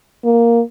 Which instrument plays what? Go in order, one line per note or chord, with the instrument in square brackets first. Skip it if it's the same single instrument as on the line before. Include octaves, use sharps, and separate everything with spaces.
[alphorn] A#3